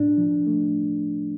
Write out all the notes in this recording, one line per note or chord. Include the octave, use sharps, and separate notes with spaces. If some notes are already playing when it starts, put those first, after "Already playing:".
Already playing: A2 D4
F3
A3